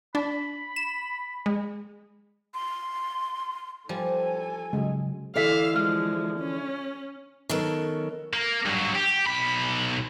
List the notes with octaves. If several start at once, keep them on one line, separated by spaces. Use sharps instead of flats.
D4 B5
E7
G#3
C6
F3 G3 A4 G#5
C#3 F#3 G#3
D3 E3 A4 E5 F5 B6
F3 G#3 F6
C#4
D#3 F#3 B3 C#4 A4 A#4
A#3
G2 F#3
G4
B1 B5